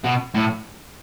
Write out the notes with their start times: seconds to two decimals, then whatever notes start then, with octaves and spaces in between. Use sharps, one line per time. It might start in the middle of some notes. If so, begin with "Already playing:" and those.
0.04 B2
0.34 A2